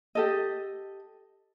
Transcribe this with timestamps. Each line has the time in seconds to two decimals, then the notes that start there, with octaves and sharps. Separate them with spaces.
0.15 G4 A4 D#5